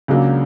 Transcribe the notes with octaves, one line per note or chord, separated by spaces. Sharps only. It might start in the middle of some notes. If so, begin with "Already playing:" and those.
C#2 C#3 F#3 A#3 D4